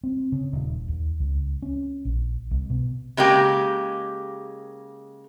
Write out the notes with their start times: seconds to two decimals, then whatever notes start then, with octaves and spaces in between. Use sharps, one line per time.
0.03 C4
0.32 C#3
0.53 D#1
0.88 D#2
1.20 C#2
1.62 C#4
2.05 A#1
2.51 C2
2.70 B2
3.17 C#3 G#3 A#3 G4 G5